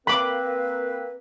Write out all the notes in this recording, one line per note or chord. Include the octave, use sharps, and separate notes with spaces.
A#3 C4 B4 B5 D6